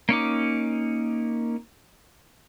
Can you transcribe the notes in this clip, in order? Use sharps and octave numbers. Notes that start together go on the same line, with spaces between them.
A#3 C#4 D#4 D6